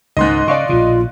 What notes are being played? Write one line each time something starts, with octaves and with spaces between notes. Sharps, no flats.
C#2 G#2 D#3 D#5 C6 F#6
C#3 D5 F5 C#6
A#1 B2 F4